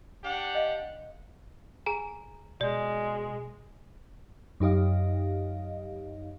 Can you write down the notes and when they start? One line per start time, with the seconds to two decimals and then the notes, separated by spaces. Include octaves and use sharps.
0.24 D4 G4 F#5
0.55 D#5 F5
1.86 G#4 G#5 A#5
2.61 B2 G#3 D5
4.60 F#2 D#4 G4 D#5 F5